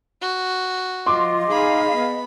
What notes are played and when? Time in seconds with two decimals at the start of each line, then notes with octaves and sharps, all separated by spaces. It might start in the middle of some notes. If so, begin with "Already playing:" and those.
0.21 F#4
1.06 F3 F4 D#5 C6 D6
1.51 D#4 G#4 F5 B5
1.95 B3